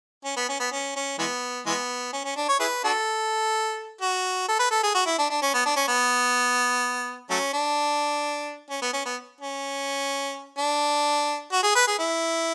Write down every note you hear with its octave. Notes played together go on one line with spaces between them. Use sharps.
C#4
B3
C#4
B3
C#4
C#4
E3 G#3 B3
E3 G#3 B3
C#4
C#4
D4
C#5
E4 G#4 B4
D4 F#4 A4
F#4
A4
B4
A4
G#4
F#4
E4
D4
D4
C#4
B3
D4
C#4
B3
F#3 A3 C#4
D4
C#4
B3
C#4
B3
C#4
D4
F#4
G#4
B4
G#4
E4